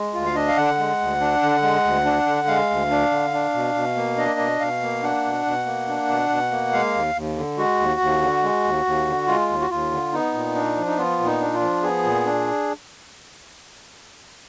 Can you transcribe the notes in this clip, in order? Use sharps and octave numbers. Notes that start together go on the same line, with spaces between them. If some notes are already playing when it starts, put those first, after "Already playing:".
Already playing: G#3
D2 F4
F5
D4 D#5
F5
D3 F#5
G#3
D2
D4
D3
G#3
D2
D4
D3
G#3 F5
D2
D4
D3
D4
B2
B2
A#3
D4 D#5
B2
B2 F5
A#3
D4 F#5
B2
B2
A#3
D4
B2
B2
A#3
G#3 F5
D#2
D#2
D3
G#3 F#4
D#2
D#2
D3
G#3
D#2
D#2
D3
G#3 F4
D#2
F#4
D#2 F4
D3
B3 D#4
A#2
D4
F3
D#4
B3 F4
A#2
D#4
D4
F4
F3
B3 G#4
A#2
D4